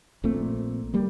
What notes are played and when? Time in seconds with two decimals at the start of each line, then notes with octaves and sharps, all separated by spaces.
0.23 A#1 A#2 A3 C4
0.94 G3 A#3